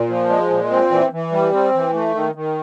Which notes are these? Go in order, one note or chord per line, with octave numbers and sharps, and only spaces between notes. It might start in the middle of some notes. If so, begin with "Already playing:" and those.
Already playing: A#2
F3
G#3
A#2
C4
E3
E3
G3
C4
E3
A3
D#3
D#3